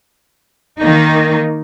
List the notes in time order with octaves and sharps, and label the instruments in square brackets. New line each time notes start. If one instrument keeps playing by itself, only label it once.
[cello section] D#3 A#3 D#4